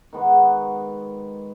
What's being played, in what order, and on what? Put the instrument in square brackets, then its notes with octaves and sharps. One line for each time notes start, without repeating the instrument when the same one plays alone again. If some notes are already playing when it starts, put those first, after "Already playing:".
[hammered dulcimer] D#3 G#3 B3 F#4